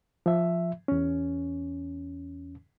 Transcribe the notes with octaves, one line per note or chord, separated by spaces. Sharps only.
F3 E5
E2 C#4